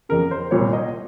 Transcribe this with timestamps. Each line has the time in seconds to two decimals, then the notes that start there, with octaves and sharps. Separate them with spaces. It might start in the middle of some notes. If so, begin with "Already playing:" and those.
0.09 F2 C#3 A#4
0.31 C5
0.51 C2 A#2 C#5
0.73 D#5